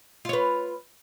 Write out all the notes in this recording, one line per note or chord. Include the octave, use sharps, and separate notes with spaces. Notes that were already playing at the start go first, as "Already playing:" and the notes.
F4 B4 C#5